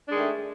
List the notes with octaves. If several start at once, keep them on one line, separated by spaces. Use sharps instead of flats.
D#3 G#3 A3 D4